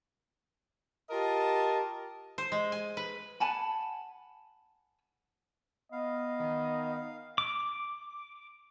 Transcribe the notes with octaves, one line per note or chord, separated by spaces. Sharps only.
F4 G4 A#4 D#5 A5
C5
G#3
G#5
B4
F#5 G#5 A5 B5
B3 D#5 F5
D#3
D6